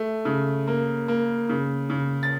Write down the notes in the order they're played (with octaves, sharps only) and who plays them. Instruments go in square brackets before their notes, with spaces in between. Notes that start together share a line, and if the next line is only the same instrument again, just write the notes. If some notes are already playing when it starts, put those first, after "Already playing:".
Already playing: [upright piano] A3
C#3
A#3
A#3
C#3
C#3
A6